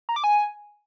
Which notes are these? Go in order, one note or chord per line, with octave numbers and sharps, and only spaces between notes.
A#5
D6
G#5